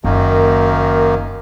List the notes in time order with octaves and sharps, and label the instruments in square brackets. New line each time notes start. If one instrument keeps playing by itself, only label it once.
[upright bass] F#1 [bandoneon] F#2 D#3 A#3